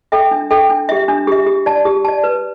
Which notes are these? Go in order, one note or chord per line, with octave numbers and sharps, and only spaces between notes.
A4 E5 G5
D4
A4 E5 G5
D4
G4 E5
D4
G4 E5
G4
D5 A5
G4
D5 A5
B4